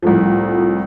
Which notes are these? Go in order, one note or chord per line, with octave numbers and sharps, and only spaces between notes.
C2 A2 F3